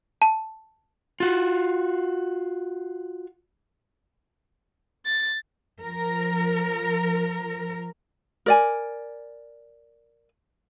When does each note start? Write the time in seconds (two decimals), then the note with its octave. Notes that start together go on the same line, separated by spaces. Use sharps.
0.22 A5
1.20 F4 F#4
5.05 A6
5.82 F3 A#4
8.46 A#4 D5 G#5